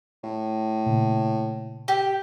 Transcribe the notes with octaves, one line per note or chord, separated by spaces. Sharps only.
A2
A#2 C#3
G4